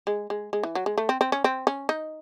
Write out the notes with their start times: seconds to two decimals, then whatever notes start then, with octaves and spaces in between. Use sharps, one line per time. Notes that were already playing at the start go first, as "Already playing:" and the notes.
0.07 G#3
0.30 G#3
0.53 G#3
0.63 E3
0.75 F#3
0.86 G#3
0.98 A3
1.09 C4
1.21 C4
1.32 C#4
1.44 C4
1.67 C#4
1.89 D#4